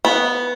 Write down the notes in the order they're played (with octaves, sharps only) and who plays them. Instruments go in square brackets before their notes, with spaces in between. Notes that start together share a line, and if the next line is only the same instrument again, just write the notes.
[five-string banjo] B3